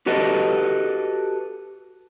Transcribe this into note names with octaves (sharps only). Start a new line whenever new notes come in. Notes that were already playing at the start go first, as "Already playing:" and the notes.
F#4 G4 A4 B4 D#5